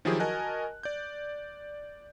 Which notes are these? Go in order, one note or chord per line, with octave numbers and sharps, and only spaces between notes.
D#3 F3 F#3 E4 G4 G#4
F#4 A#4 D#5 G#5 A5 F#6
D5 G6